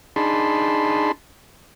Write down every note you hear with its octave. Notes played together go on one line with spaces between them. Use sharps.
D4 D#4 G#4 A5 B5 C6